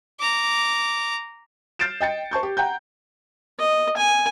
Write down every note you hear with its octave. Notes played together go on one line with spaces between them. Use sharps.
A#5 D6
F6 G6 A6 C7 D7 E7
D#5 G5 A6 C#7
C5 A5 C#6 G6
G4
F#5 G5 A#5 G6
D#5
G#5